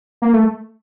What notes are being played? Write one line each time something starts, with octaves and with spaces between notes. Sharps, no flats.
A#3
A3